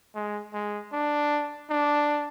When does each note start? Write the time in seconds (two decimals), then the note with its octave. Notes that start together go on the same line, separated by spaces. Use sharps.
0.15 G#3
0.53 G#3
0.92 D4
1.70 D4